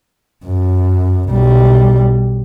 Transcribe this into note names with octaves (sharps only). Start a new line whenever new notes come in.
F#2
B1 G3